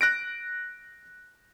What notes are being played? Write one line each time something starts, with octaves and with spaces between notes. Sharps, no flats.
F#6 A#6 D7